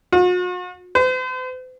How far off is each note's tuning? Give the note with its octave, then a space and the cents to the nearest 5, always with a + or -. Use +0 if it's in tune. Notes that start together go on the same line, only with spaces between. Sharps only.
F#4 -45
C5 -45